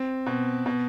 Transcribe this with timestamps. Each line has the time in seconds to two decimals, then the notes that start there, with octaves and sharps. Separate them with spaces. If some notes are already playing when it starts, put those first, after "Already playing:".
Already playing: C4
0.26 B2
0.66 B2